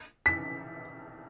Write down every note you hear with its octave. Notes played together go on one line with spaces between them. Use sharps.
B6